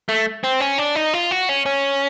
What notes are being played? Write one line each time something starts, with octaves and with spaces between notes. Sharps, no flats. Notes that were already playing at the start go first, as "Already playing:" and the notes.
A3
C4
C#4
D4
D#4
F4
F#4
C#4
C#4